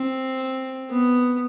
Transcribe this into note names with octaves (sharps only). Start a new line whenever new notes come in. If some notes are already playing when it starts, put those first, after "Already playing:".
Already playing: C4
B3